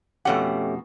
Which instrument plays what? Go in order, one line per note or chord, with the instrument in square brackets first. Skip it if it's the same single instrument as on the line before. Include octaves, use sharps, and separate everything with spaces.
[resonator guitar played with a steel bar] F2 B2 F#5 [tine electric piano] A3 C#4 G4